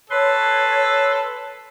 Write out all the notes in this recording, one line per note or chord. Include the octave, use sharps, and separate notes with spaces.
A4 B4 C#5 C6